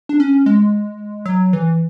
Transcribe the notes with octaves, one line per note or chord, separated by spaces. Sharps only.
D4
C#4
G#3
F#3
E3